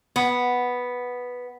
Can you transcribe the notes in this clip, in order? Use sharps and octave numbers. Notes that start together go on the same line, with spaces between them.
B3